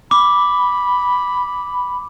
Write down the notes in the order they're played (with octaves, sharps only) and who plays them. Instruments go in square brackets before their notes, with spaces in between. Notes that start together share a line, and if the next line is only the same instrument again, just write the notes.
[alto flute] B5 [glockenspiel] D6